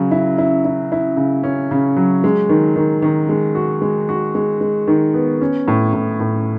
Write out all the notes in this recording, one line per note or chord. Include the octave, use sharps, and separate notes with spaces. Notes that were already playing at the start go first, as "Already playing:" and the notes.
Already playing: C#3 F#3
E4
E4
E4
E4
C#3
C#4
C#3
F#3
G#3
D#3
D#3
D#3
G#3
F#4
G#3
F#4
G#3
G#3
D#3
B3
C#4
A2
A2
A2